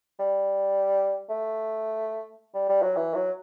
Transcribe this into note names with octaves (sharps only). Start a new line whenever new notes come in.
G3
A3
G3
G3
F#3
E3
F#3